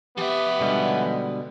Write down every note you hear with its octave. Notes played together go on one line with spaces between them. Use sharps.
F3 B3 G4 E5
B2 D3 G3 G#3